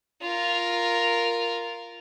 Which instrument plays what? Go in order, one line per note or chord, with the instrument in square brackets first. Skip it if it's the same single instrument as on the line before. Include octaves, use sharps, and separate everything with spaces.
[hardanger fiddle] F4 A#4